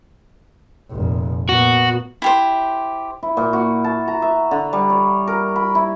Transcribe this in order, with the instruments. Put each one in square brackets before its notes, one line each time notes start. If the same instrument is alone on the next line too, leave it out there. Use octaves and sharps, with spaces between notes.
[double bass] F1 A#2
[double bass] A#2 B3 [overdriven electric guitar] F#4
[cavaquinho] E4 G4 C5
[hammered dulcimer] E4
A#2
F#4
A5
A#5
E5
D3
G3
C#5
A#4
B5
E4